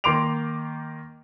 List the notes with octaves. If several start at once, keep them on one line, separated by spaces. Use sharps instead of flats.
D#3 A#3 C6 D6 D7 F7